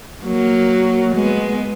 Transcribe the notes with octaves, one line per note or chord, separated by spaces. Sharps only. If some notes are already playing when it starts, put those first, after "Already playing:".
F#3 A#3
G#3 B3